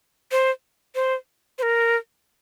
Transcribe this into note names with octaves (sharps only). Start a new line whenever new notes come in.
C5
C5
C5
A#4